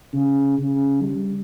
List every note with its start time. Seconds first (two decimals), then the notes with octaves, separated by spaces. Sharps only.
0.13 C#3
0.58 C#3
1.02 G3